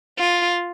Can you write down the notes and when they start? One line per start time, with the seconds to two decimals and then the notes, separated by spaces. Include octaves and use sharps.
0.19 F4